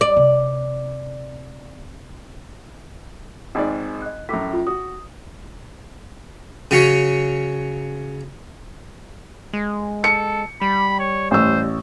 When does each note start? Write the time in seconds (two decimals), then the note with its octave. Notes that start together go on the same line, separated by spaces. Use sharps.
0.01 D5
0.17 C3
3.55 G#1 G#2 D5
4.02 D#5 F#6
4.29 F#2 A2 D6 B6
4.53 F4
4.67 F#4 D#6
6.71 C#3 F#3 C#4
9.53 G#3
10.04 A4 C#7
10.62 G3 B5
10.99 C#5
11.31 A1 C5 E6